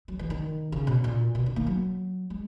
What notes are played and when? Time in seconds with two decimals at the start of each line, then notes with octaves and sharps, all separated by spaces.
0.08 F#3
0.19 E3
0.30 D#3
0.72 C#3
0.87 B2
1.04 A#2
1.35 B2
1.46 D#3
1.56 A#3
1.67 F#3
2.30 G#3